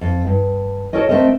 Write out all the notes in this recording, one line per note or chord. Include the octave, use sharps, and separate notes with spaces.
F2
G2
F#4 G4 A4 A#4 C#5 D#5
A3 C4 D4 A#4 D#5